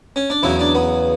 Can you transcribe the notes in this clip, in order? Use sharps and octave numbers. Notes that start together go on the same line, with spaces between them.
C#4
D4
E2 C#3 F#3 E4
D4
B3